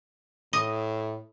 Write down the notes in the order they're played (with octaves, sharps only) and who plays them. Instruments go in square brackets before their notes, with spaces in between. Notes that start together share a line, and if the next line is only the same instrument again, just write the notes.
[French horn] A2 [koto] D#5